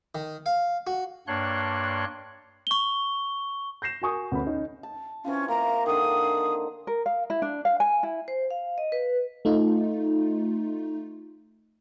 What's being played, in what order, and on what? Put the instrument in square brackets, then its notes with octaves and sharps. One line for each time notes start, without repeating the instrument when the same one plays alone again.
[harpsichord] D#3
F5
F#4
[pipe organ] G2 A#3 D4 C#5 C6 F#6
[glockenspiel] C#6 G7
[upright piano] G6 A#6 C7 E7
F#4 A#4 G#5 C#6 D#6
D2 B3 C#4 B5
C#4 D#4
[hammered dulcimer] A5
[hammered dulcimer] E3 C4 F4 [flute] C#4
[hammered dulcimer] A#3 [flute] A#5
[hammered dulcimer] D3 D#3 [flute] D#6
[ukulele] A#4
F5
E4
D4
F5
G#5
E4
[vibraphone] C5
F5
D#5
B4
[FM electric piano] A3 D#4 F4